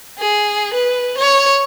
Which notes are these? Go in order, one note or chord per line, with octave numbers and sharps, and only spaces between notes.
G#4
B4
C#5